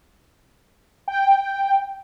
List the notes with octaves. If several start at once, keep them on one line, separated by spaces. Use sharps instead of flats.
G5